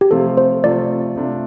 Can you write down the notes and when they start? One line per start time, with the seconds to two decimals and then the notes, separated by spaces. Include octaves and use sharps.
0.01 G4
0.11 C3 F3 A3 C4 F4 A4
0.37 C5
0.63 C3 F3 A3 C4 F4 D5
1.16 C3 A3 D4 F4